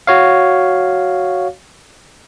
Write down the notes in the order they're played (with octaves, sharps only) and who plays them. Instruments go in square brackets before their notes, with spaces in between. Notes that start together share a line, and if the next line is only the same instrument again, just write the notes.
[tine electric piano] F#4 C#5 F5